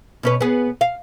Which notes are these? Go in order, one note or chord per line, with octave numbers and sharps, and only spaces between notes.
B2 C#4 B4
B3 G#4
F5